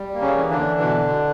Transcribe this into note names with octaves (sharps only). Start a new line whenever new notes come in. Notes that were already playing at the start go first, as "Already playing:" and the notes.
Already playing: G3
A#3
C#3 C#4
E3
D3 D4
E3
B2